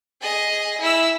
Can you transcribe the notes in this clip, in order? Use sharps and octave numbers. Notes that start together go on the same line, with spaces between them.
G#4 D#5
E4 E6